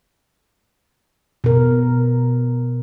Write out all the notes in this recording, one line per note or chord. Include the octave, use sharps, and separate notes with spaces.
B2 A#4